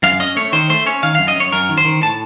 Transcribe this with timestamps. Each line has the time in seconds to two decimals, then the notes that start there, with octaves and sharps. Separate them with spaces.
0.03 F#2 F5
0.20 C#4 D#5
0.37 A3 C#5
0.53 D#3 C5
0.70 A3 C5
0.86 C#4 C#5
1.03 D#3 F5
1.15 F#2 F5
1.28 D#5
1.36 F#2 C#5
1.52 F#2 A#4
1.69 D#3
1.78 C5
1.85 D#3
2.02 A2 A5